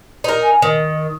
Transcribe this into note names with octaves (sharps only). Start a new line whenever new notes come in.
D#4 A#4 D5
G#5
D#3 D#5